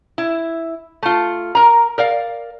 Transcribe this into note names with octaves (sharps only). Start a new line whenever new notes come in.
E4
A3 F4
A#4 A#5
A#4 D5 F5